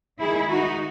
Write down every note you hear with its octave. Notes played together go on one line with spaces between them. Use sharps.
D#3 G#3 D#4 E4 G#4
D#4 F#4